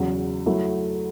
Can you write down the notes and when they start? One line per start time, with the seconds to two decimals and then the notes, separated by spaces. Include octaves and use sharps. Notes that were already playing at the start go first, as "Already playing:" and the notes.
Already playing: E2 C#3 F#3
0.46 F#3 A3 E4